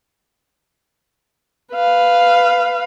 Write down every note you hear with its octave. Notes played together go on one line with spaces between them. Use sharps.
B4 F5